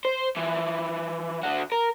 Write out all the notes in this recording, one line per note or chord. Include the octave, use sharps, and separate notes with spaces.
C5
E3 F3
D3 F#4
A#4